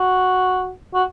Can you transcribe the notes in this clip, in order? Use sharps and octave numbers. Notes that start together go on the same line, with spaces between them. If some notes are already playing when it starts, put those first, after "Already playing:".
Already playing: F#4
F#4